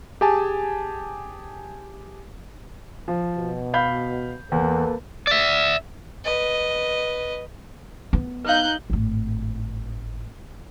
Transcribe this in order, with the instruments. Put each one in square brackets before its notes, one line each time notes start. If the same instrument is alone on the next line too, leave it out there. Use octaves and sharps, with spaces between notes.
[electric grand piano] G4 G#4 G#5 A5
[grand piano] F3
[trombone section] B2
[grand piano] F5 B5 G6
[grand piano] E2 [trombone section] A#3 A4 B4
[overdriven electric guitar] D5 E5
[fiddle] B4 D#5
[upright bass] B3
[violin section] D#4 F#6 G6 [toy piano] B4 F5
[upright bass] G#1 A2